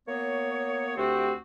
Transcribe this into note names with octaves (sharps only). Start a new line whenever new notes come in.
A#3 B3 C#5
D2 A3 C4 F#4 G4